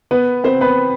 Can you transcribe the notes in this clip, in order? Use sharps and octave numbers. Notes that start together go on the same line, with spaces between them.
B3 B4
C4 C5
B3 B4